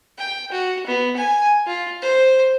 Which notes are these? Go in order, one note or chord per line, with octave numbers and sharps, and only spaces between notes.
G5
F#4
B3
G#5
F4
C5